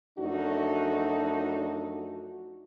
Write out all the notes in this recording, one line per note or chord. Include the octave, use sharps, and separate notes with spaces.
F#2 F3 A3 D4 D#4 F#4